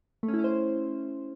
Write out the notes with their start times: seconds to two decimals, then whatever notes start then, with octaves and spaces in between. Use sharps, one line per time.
0.23 A3
0.28 C#4
0.34 E4
0.39 C#4
0.44 C5